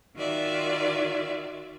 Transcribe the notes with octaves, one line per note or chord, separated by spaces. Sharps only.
D#3 F4 F#4 D5 E5